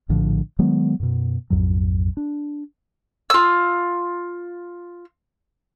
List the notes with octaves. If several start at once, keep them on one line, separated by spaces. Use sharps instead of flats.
A#1 A2 D3 F3
D#3 F#3 G#3 B3
F#2 B2
A#1 F2 G#2 F#3
D4
F4 E6